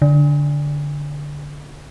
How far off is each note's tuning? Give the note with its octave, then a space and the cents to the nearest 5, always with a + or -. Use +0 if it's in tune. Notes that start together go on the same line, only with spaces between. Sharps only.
D3 -10